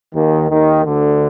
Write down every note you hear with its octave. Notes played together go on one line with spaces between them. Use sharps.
D#2 D#3
D#2 D#3
D2 D3